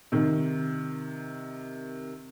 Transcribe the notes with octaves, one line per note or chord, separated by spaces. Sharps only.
C3 D#3